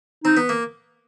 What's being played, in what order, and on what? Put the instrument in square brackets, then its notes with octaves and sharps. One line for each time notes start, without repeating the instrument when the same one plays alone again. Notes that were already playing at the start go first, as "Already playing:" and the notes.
[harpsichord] C4 [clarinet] D#4
[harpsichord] B3
A#3